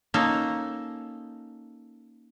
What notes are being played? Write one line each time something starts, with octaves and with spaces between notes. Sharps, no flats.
A#3 C#4 D#4 A4